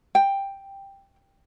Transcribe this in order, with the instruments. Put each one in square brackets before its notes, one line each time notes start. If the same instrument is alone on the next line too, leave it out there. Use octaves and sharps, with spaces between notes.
[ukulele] G5